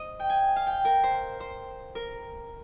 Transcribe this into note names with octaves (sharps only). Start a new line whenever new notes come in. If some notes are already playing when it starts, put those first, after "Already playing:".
Already playing: C5 D#5
G5
G#5
F5
G5
A#4
C5
C5
A#4